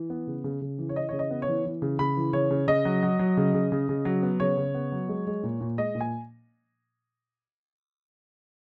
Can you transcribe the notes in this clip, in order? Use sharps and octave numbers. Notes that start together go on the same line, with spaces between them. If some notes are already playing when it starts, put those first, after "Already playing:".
Already playing: E3
B3
C#3
C#3
C#3
E3
C#5
E3 D#5
C#3 C#5
D#5
B3
C#5
E3
E3
C#3
C#3 B5
E3
C#3 C#5
C#3
C#3 D#5
F#3
F#3
F#3
C#3
C#3
C#3
C#3
F#3
B3
C#3 C#5
C#3
B3
F#3
G#3
G#3
A#2
A#2
G#3 D#5
A#2
G#5